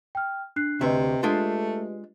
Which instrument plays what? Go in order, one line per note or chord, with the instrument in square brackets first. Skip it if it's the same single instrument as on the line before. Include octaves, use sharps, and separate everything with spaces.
[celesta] G5 F6
D4 F#6 C7
[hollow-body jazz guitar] D2 E5 [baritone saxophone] C3 [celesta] G4 B4 D#5
[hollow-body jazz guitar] G#3 D4 F4 [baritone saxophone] A3